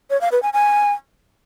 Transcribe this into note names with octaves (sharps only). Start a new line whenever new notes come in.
C#5
F5
B4
G#5
G#5